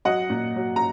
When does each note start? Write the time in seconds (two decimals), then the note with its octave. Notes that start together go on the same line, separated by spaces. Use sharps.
0.05 F#3 D#5 F#5
0.30 A#2
0.56 F#3
0.76 A#5